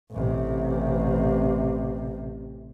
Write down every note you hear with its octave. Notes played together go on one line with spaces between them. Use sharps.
A1 C3